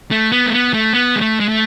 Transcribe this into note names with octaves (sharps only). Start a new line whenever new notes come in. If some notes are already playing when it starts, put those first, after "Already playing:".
A3
B3
A3
B3
A3
B3
G#3
A3
G#3
A3